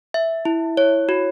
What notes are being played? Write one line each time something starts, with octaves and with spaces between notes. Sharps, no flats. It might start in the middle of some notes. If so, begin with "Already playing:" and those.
E5
E4
C#5
F#4